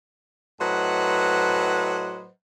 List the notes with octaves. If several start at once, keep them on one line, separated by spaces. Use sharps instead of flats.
A2 F#3 B4 C5 D#5 F#5